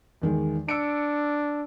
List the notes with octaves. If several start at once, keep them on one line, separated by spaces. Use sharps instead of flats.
E2 D#3 G#3
D4 E6 C#7 D7